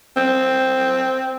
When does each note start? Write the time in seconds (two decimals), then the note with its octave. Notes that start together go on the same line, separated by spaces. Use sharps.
0.17 C4